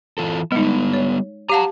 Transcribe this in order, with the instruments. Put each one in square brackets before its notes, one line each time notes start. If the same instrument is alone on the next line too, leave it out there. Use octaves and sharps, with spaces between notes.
[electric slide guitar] E3 F4 A4
[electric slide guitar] G3 B3 [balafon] G#3 D#4
[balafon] C#5
[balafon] G4 F5 A5 [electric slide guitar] F#5 A#5